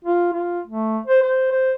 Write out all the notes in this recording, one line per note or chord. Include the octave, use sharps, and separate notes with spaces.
F4
F4
A3
C5
C5
C5